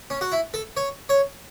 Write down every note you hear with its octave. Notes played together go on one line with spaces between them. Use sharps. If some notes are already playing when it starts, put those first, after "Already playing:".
C#4
F#4
E4
A4
C#5
C#5